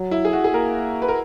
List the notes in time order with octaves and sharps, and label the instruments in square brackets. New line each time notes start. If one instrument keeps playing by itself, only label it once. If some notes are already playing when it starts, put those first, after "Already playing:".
Already playing: [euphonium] F#3
[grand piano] E4
G#4
F#4
G#4
[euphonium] A#3 [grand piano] A#4
[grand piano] B4
A#4